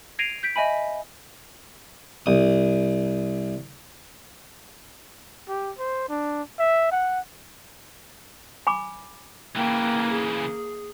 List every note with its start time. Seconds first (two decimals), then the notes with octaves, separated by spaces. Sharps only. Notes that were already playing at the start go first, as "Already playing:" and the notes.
0.19 G#6 A#6 C7 D7 D#7 F7
0.43 G6 B6 D7
0.56 D#5 E5 G#5 B5
2.26 C2 D#6
5.48 G4
5.78 C5
6.09 D4
6.59 E5
6.92 F#5
8.67 G#5 B5 D6
9.56 C#3 E3 A#3 G5
10.10 G#4